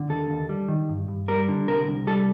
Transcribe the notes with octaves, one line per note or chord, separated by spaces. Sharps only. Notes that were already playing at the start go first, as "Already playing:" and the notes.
Already playing: D3
D#2 A4
D#2
G3
D#3
G2
G2
G3 A#4
D3
C2 A#4
C2
G3 A4